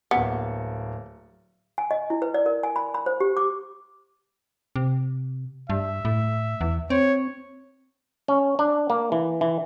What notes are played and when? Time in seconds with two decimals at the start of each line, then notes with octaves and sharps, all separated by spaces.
0.11 D1 A#3 B3 C#7
1.78 G#5
1.91 D#5
2.10 E4
2.22 B4
2.34 D5
2.46 A#4
2.63 G#5
2.76 B5
2.94 B5
3.06 C5
3.20 G4
3.37 D6
4.76 C3
5.70 G2 E5
6.05 A2
6.61 E2
6.90 C4 C#5
8.28 C#4
8.59 D4
8.90 A#3
9.12 E3
9.41 E3